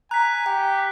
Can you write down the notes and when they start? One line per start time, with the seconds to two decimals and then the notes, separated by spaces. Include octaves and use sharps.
0.11 G#5 A#5 F#6 B6
0.46 G4 G5